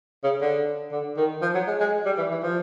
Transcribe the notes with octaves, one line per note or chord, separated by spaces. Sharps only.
C#3
D3
D3
D#3
F3
F#3
G#3
G#3
G3
E3
E3
F3